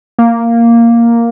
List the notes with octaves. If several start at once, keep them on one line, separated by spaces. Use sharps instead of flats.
A#3